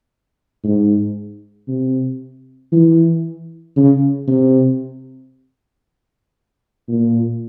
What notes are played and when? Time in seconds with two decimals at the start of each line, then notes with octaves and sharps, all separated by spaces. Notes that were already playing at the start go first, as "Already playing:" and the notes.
0.64 G#2
1.68 C3
2.72 E3
3.77 C#3
4.28 C3
6.88 A#2